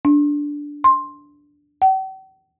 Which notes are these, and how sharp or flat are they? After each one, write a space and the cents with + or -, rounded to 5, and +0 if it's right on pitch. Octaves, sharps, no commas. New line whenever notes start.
D4 -5
C6 +10
G5 -45